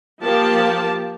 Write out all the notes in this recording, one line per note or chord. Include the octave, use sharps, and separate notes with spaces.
F3 A#3 G4 A5